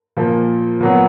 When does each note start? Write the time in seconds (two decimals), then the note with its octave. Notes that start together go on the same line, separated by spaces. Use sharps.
0.17 A#2 F3 A#3
0.80 A#2 F#3 B3